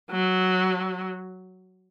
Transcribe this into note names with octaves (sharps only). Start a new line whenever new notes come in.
F#3